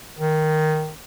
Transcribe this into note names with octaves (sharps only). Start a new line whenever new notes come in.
D#3